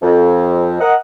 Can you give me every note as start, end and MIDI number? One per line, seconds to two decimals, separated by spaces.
0.02 0.76 41
0.80 0.94 70
0.80 0.94 75
0.80 0.94 78